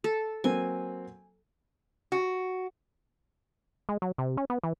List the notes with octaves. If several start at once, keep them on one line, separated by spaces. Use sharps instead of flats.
A4
F#3 A#3 C4 G#5
F#4
G#3
F#3
C3
C#4
B3
E3